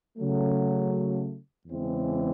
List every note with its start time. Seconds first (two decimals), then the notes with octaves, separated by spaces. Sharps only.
0.18 C#3 F#3 A3
1.67 E2 C#3 E3 G#3 C4